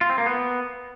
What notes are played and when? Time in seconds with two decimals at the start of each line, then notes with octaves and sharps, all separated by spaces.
0.01 F4
0.10 C4
0.18 A#3
0.26 B3